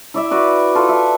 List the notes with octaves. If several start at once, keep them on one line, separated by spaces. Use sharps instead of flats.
E4 D5 E5
F#4 B4 D5
F4 A4
E5